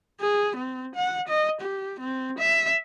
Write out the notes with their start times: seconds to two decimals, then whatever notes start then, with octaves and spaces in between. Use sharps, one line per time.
0.20 G#4
0.56 C4
0.95 F#5
1.28 D#5
1.61 G4
2.00 C4
2.38 E5